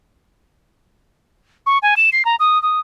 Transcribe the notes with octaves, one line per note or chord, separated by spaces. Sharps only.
C#6
G#5
E7
C7
A#5
D#6
D#6